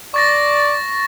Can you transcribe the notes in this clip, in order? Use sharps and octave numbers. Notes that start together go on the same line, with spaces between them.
D5 C#6 A6 A#6